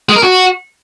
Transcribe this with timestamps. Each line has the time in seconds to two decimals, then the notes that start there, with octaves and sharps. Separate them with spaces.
0.09 G#3
0.16 A#4
0.23 F#4